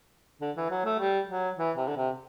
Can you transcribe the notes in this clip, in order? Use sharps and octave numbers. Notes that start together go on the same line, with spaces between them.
D3
E3
F#3
A3
G3
F#3
E3
C3
D3
C3